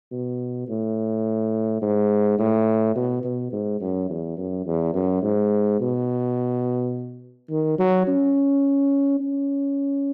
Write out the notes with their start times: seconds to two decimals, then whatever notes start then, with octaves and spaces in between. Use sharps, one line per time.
0.11 B2
0.68 A2
1.82 G#2
2.39 A2
2.96 B2
3.24 B2
3.52 G#2
3.81 F#2
4.09 E2
4.37 F#2
4.66 E2
4.94 F#2
5.22 G#2
5.80 B2
7.50 D#3
7.79 F#3
8.07 C#4
9.20 C#4